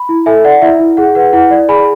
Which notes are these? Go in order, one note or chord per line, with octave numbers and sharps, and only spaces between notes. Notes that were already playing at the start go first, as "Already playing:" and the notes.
Already playing: B5
E4
A4 E5 G#5
D5 F#5
E4 E5
E4
G#4 F#5
B4 F#5
E4 F#5
D5
G#4 G#5 B5